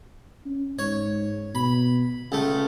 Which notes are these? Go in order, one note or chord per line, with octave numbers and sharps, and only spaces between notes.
C#4
G#2 C#5
B2 B5
C#2 C#3 A3